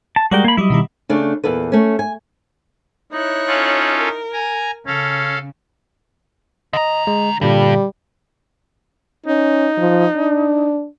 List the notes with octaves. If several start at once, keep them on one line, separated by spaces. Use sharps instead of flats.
A5
G3 G#3 F#4 A#4 D5 G5
A#3 B5 G#6
F#3 G3 E4 D#5
B2 D#3 G3
C#3 A3 D4
E2 A#2 A4 B4
A3 C#4
G#5
D#4 E4 C#5 F#6
C#4 F4 A4
A#4
G#5 A#5
C#3 C#4 A4 F5
D3 D#5 A#5
G#3
G2 A#2 D3 G3
C#4 D#4
F3
D4